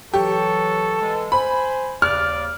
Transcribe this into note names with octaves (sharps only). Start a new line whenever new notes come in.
E3 F#3 G4 A4 C#6
E3 G#3
C5 G#5 B5
D#2 C#3 D5 F6